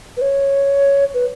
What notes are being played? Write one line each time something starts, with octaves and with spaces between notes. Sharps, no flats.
B4
C#5
B4